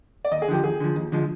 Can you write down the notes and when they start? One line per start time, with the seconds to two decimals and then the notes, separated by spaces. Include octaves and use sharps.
0.25 D5
0.32 D#2 D#5
0.42 G#4
0.48 D3 F3 G4
0.63 D#2 G#4
0.80 D3 F3
0.96 D#2
1.12 D3 F3 G#3